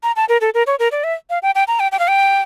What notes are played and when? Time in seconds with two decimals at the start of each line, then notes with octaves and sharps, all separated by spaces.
0.03 A#5
0.16 A5
0.29 A#4
0.41 A4
0.54 A#4
0.67 C#5
0.79 A#4
0.92 D5
1.04 E5
1.30 F5
1.43 G5
1.55 G5
1.68 A#5
1.80 G5
1.92 G5
1.99 F5
2.08 G5